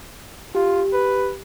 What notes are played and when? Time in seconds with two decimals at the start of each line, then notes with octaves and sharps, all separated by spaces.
0.55 F4 G4
0.93 B4